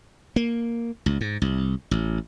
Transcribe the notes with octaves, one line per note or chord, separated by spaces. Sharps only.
A#3
C#2
G#2
C2
A1